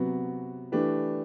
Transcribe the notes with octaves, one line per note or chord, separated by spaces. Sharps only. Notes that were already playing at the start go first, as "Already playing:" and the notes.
Already playing: C3 F#3 B3 F#4
E3 A3 D4 G4 B4